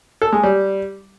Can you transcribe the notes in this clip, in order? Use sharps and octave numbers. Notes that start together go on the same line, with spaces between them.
A4
G#3
G3